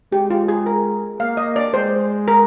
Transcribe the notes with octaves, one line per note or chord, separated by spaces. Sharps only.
G#3 G4
F4
G#4
A#4
A#3 F5
D#5
D5
G#3 C5
A#4